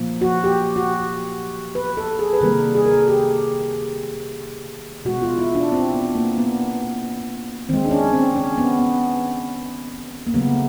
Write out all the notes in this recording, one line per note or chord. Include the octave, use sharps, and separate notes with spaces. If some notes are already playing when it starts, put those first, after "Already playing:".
Already playing: A#2 F3 A#3
F#4
G4
F#4
B4
A4
G#4
B4
C3 D#3 G3 A#3 A#4
G#4
A#4
A4
G#4
G4
B2 G#3 F#4
F4
E4
D4
C4
B3
A#3
B3
D#3 G#3 C4
D4
C#4
C4
C#4
B3
B3
A#3
C#3 F#3 A3 B3